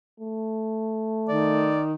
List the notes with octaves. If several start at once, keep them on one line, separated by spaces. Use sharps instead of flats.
A3
D#3 D5